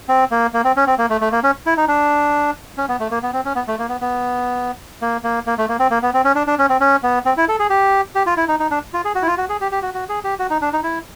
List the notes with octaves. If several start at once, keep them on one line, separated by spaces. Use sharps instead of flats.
C4
A#3
A#3
C4
C#4
C4
A#3
A3
A3
A#3
C#4
E4
D#4
D4
C#4
B3
A3
A#3
B3
C4
C#4
B3
A3
A#3
B3
B3
A#3
A#3
A#3
A3
A#3
C4
A#3
B3
C4
C#4
D4
D4
C#4
C4
C#4
B3
C4
E4
A4
G#4
G4
G4
F4
E4
D#4
D#4
D4
F4
G#4
F#4
E4
F4
F#4
G#4
G4
G4
F#4
F#4
G#4
G4
F#4
D#4
D4
D#4
E4